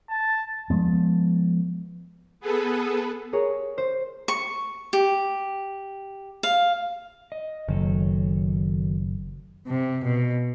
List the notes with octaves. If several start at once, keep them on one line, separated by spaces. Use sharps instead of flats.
A5
F3 G#3 B3
B3 G#4 A4 B4
G#4 A#4 C#5
C5
C#6
G4
F5
D#5
F#1 D#3 F#3 A4
C3
B2